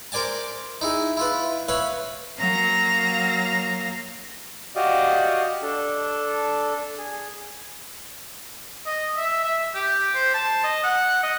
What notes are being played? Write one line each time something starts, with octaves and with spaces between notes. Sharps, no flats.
A#4 C5 D5 G#5 A5
D#4 E4 G#4
E4 F4 B4
B4 C#5 E5 F5 B5
F#3 A#3 F5 A#5 A#6
F#4 G4 D5 D#5 F5
D4 A4
G#4
D#5
E5
E5
G4
C5
A5
D#5
F#5
D#5